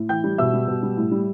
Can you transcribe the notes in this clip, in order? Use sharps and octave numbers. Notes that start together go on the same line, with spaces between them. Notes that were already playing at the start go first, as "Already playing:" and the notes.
Already playing: A2
E3 G5 G6
G3
B2 E5 E6
G3
B2
G3
A2
G3